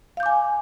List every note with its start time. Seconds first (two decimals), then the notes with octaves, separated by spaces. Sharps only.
0.17 F5
0.20 G6
0.23 D6
0.26 G#5